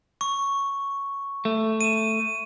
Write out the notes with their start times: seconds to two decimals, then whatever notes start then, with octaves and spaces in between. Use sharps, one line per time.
0.21 C#6
1.45 A3
1.81 D#7 E7